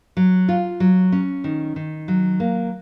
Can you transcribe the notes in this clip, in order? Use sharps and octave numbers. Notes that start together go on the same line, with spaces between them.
F#3
F4
F#3
C#4
D#3
D#3
F#3
A#3